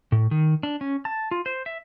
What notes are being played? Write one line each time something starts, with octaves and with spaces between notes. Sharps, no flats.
A2
D#3
D4
C#4
A5
F4
C5
E5